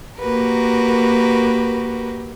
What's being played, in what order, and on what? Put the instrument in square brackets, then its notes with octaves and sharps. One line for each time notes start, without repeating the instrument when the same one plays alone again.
[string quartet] A#3 F#4 G4 A#4 B4